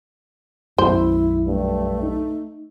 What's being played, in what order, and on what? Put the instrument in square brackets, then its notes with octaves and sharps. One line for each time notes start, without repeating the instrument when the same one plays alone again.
[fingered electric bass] B1 F#2 [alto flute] E4 [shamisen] C5
[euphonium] G2 [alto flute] A3
[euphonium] D#4